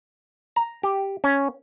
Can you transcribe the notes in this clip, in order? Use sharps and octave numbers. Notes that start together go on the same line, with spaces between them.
A#5
G4
C#4